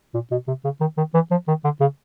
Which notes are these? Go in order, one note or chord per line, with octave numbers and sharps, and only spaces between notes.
A#2
B2
C3
C#3
D#3
D#3
E3
F3
D#3
D3
C#3